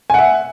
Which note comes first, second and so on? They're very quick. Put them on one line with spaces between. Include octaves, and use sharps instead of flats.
G#5 F#5 E5